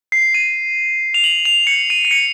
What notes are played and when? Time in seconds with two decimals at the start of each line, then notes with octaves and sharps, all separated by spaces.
0.12 C7
0.34 D#7
1.14 F7
1.24 F#7
1.45 F7
1.67 C#7
1.90 D#7
2.05 D#7
2.11 C#7